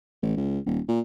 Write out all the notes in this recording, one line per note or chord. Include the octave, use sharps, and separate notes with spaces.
A1
C#2
D#1
A#2